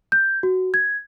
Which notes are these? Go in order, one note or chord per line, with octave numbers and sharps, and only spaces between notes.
G6
F#4
G#6